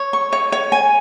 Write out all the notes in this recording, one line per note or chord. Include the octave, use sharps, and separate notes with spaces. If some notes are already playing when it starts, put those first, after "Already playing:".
Already playing: C#5
C#6
C#5
C#5
G#5